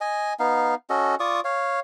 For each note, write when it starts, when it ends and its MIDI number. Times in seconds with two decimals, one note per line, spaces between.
0.01 0.33 75
0.01 0.33 80
0.39 0.75 59
0.39 0.75 63
0.39 0.75 77
0.90 1.15 61
0.90 1.15 66
0.90 1.15 69
0.90 1.15 75
1.20 1.40 65
1.20 1.40 74
1.20 1.40 85
1.20 1.40 87
1.45 1.80 73
1.45 1.80 77